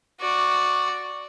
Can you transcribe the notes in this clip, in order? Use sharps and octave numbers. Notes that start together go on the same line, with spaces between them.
F#4 D5